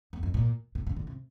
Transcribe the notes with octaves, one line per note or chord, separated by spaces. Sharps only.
E2
F2
A#2
C3
C#3
D3
C3